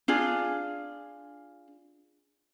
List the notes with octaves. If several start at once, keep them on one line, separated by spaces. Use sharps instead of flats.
D4 F4 G#4